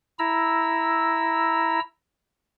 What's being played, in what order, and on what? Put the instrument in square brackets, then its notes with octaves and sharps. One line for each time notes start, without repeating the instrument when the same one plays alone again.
[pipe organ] E4 A#5 E6